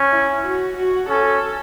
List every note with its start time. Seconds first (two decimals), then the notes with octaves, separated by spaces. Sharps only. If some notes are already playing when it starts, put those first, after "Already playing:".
Already playing: C#4
0.12 E4
0.45 F#4
0.76 F#4
1.09 C#4 A4